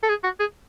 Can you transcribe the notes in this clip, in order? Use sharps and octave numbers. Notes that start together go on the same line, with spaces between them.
A4
G#4
F#4
G#4